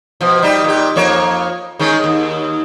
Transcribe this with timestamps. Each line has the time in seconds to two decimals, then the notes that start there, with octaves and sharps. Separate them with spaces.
0.21 B2 F3
0.43 G3 D#4 G4
0.64 A#2 G4
0.96 F2 A#3 C#5
1.79 D#3 G#3 C#4
2.04 D#2